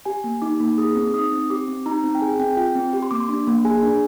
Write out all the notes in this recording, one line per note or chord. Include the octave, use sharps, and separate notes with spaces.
G4 G#5
A#3
D#4 D6
A#3
G#4 D#6
C4
D#4 D#6
C4
G4 D6
C4
D#4 A#5
C4
G5
G#4 G#5
C4 G5
F4 G5
C4
G4
C6
A#3 D6
C6
D4
A#3
G#4 G#5
D4